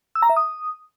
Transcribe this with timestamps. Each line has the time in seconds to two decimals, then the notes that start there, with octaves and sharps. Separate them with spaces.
0.15 E6
0.22 A#5
0.29 E5
0.36 D#6